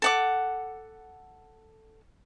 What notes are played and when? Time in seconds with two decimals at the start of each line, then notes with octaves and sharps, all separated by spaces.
0.02 A4 F#5 D6